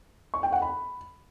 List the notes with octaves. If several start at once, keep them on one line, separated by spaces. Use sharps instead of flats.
C#6
G5
F#5
B5